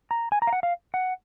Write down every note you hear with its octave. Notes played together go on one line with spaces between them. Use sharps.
A#5
G#5
A#5
F5
F#5
F5
F#5